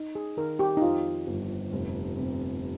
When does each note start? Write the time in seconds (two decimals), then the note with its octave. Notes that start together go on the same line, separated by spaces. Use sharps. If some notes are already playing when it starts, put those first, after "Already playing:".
Already playing: D#4
0.15 G#4
0.37 D#3 A#4
0.59 G4
0.77 D#4
0.82 F2 F4
1.27 G1
1.73 F1
2.17 C3